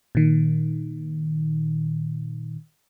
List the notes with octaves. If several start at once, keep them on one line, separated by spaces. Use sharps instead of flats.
A#2 D#3